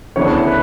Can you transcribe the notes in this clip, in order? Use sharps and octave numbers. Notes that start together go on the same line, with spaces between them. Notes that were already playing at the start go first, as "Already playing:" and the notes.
D2 C#3 E3 B3 D4 C#5
B4